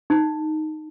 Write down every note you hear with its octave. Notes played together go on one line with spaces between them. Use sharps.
D#4